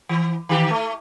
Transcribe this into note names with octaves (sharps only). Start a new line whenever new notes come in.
E3
D#3 G4
A3